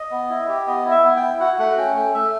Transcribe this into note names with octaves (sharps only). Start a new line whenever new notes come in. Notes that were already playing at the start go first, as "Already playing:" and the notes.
Already playing: D#5
B3
E4
G4
B3 D#5
E4
E5
B3
E4 G5
F#4 F#5
A3 F#5
C#4 G5
A3 G5
A3 E5